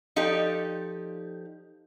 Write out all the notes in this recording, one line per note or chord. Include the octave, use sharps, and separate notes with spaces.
F3 D#4 G4 A4 D5